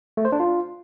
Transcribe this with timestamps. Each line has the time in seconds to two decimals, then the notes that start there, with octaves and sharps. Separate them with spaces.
0.17 A3
0.25 C5
0.32 D4
0.40 F4